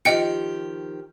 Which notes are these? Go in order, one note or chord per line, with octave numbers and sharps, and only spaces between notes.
D#3 F3 G4 D#5 G5 C#7